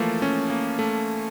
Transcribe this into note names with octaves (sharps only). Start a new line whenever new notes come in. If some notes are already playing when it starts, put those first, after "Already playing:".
Already playing: E3 F3 A3 A#3
C#4
A#3
A3